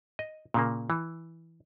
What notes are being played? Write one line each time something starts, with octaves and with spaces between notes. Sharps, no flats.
D#5
A#2 C#3 A#3
E3